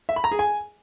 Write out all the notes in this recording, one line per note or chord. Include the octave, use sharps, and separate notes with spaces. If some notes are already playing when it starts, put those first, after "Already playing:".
E5
B5
A#5
G#4
G#5